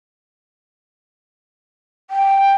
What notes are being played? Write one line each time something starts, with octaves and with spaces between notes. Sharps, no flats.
G5